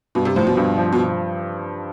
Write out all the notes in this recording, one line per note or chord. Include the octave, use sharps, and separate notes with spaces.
G2 B2
C3
A2 F3 C4
B2
G2
F3 C4
B2